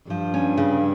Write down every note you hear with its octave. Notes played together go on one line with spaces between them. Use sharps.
G2 F3
C#4
C#3